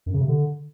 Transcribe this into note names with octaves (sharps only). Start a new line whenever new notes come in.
F#2
C#3
C3
D3